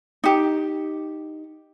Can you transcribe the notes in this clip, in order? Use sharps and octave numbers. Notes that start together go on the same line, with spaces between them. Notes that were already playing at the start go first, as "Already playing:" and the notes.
D#4 G4